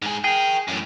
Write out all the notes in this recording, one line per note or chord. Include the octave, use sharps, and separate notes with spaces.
G#2 G#4
G#4 A#4 G5
F#2 A2